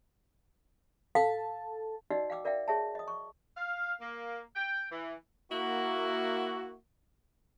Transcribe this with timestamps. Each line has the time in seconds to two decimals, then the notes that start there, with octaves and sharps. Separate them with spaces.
1.15 A4 F5 A5
2.10 D#4 F#4 D5 D#5 F#5 E6
2.30 F5 G5 D6 E6
2.45 A#4 D5 E5 F5 G5
2.68 G#4 C#5 E5 G5 A5
2.95 D#5 D#6
3.08 C#6
3.56 F5
4.00 A#3
4.55 G5
4.90 E3
5.52 A#3 E4 F#4